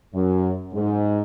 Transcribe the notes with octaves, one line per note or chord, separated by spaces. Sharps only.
F#2
G#2